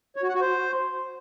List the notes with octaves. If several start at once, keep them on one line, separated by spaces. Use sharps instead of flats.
C#5
F#4
F#5
F#4
C5